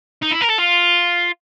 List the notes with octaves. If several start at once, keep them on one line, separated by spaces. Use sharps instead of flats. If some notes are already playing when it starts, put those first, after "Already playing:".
D#4
E4
A#4
A4
F4